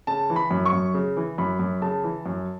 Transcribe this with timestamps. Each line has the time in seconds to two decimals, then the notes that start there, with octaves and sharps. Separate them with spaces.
0.07 C#3 A5
0.30 E3
0.36 B5
0.51 F#2
0.66 C#6
0.73 F#2
0.94 C#3
1.17 E3
1.38 F#2 B5
1.59 F#2
1.81 C#3 A5
2.04 E3
2.26 F#2